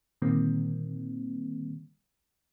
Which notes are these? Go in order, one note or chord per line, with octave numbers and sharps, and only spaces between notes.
A#2 D3 D#3 G3 A#3 C4